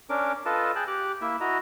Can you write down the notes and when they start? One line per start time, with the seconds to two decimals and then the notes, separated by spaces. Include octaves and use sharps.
0.10 C#4 D4 A#4 D6
0.46 F4 A4 B4 D#5 A5
0.76 G#4 G5 A5 F#6
0.88 G4 D6 F#6
1.22 A#3 E4 E5
1.41 E4 F#4 D#5 A#5